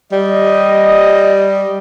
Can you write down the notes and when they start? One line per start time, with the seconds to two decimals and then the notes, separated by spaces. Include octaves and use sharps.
0.12 G3 D#5